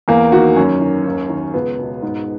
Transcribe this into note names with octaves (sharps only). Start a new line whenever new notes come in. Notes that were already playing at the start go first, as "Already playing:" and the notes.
E2 A#3
D#3 F#4
F#2 C#4
D#3
D#2
D#3
C#2 B3
B2
G#2